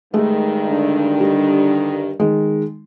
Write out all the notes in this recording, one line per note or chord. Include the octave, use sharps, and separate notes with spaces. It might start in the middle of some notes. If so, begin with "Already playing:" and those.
G2 D#3 G#3 A3
D3
G3
D#3 G#3